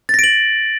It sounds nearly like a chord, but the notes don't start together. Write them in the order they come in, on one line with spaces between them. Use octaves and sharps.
A6 A#6 D7 F#7